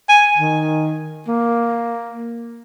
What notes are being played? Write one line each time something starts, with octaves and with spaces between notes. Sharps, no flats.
G#5
D#3
A#3